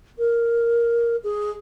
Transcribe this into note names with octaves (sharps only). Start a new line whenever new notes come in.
A#4
G#4